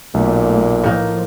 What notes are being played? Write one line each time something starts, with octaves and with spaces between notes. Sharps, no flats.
B1 A#2 A3
A2 F3 A#3 D#4